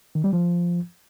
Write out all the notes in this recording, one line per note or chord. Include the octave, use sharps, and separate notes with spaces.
D#3
G3
F3